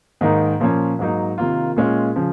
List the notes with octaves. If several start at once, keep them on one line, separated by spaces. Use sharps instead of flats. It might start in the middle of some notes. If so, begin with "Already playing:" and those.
G#2 D#3 A#3 D#4
A#2 F3 A#3 C#4
G#2 F#3 A#3 D#4
C3 D#3 A#3 F4
A#2 G#3 C#4 F4
C#3 F3